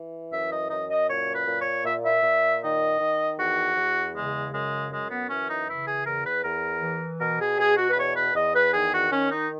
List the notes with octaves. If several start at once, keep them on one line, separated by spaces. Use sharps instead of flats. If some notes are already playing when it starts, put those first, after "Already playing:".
Already playing: E3
F#2 E5
D#5
F#2 D#5
D#5
A#2 C#5
B4
A#2
C#5
A#2 E5
E5
A#2
D#3 D#5
D#3
E2 F#4
E2
C#3 G#3
F#2 G#3
F#2 G#3
B3
E3 C#4
D#4
C#3 E4
G#4
E2 A#4
B4
E2 A#4
E3
B2 A#4
G#4
B2 G#4
F#4
B4
E2 C#5
B4
E2 D#5
B4
D#3 G#4
F#4
D#3 C#4
D#4